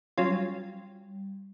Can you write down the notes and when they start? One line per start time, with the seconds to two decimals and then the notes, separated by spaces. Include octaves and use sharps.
0.18 F#3 G3 C#4 F4